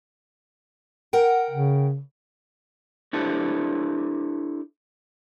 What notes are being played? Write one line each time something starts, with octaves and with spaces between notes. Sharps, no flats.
A#4 F#5 G5
C#3
D4 E4 G4 A4 C5 A5